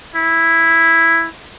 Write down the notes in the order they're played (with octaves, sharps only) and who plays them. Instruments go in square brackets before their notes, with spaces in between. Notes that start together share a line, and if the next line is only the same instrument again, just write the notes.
[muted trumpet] E4